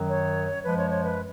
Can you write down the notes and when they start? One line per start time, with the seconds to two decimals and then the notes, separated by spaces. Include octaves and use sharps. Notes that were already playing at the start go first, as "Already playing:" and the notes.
Already playing: F#2 D#3 F#3
0.09 C#5
0.65 F#2 F3 G#3 B4
0.77 C#5
0.90 C#5
1.03 B4